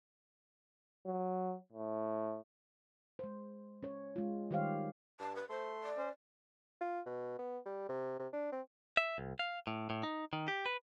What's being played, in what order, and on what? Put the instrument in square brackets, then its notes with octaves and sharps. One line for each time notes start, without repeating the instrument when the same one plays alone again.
[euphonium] F#3
A2
[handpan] G#3 C5
C#4 C#5
G#3 F4
D#3 G3 G4 C5 C#5 F5
[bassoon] G2 [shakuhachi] A5
[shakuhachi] B4
[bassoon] A3 [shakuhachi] C5 [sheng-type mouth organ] C6
[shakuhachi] D5
[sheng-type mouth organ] C#4 C5
[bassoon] F4
B2
B3
G3
C3
C3
D4
C4
[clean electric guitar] E5
C2
F5
A2
A2
D#4
D#3
G4
B4